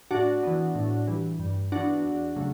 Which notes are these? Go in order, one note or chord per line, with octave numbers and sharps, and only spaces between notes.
A2 D4 F#4
E3 B3
A2
E3 G3
G2
E3 B3 D4 F#4
E2
C#3 F#3 A3